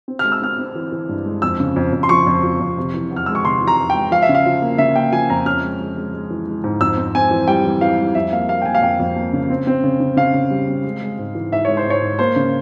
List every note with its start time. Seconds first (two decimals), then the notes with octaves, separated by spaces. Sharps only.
0.08 C4
0.19 F6
0.24 G#3
0.32 E6
0.42 C4 F6
0.58 C4
0.75 E3
0.92 E3
1.09 G2
1.26 G#3
1.42 F2 E6
1.60 C#3
1.76 F2
1.93 F2
2.03 C6
2.09 F3 C#6
2.27 F2
2.43 F3
2.60 F2
2.78 C3
2.94 E3
3.11 E2
3.16 F6
3.26 G#3 E6
3.35 C#6
3.45 C3 C6
3.61 E3
3.67 A#5
3.79 E2
3.90 G5
3.95 G#3
4.11 F3 F5
4.22 E5
4.29 C#3
4.35 F5
4.46 F3
4.62 A#3
4.78 C#3 E5
4.96 A#3 G5
5.12 F3 G#5
5.30 F2 A#5
5.46 C#4 F6
5.63 G#3
5.80 G#3
5.97 G#3
6.14 G#3
6.30 E3
6.47 G#3
6.64 G#2
6.81 F2 E6
6.98 C4
7.15 C4 G#5
7.31 E3
7.48 G3 G5
7.65 E3
7.81 E3 F5
7.99 G3
8.15 F2 E5
8.32 A#3 F5
8.49 A#3 F5
8.62 G5
8.65 A#3 G#5
8.75 F5
8.82 F2 G5
9.00 F2
9.16 A#3
9.33 C#3
9.50 C4
9.67 C4
9.84 C#3
10.00 C#3
10.17 C#3 F5
10.34 C#3
10.50 G3
10.68 C4
10.84 G#3
11.02 G#3
11.19 G#2
11.35 E3
11.52 G#2 E5
11.65 G#3 C#5
11.77 C5
11.86 G#2 C#5
12.02 G#2
12.19 A#3 C5
12.36 C#3